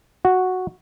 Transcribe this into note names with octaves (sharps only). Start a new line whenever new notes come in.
F#4